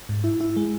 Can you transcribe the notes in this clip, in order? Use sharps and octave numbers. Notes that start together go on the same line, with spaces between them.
G#2
E4
E4
G#3